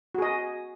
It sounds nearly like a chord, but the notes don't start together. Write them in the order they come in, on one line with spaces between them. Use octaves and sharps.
F#4 G#4 D#5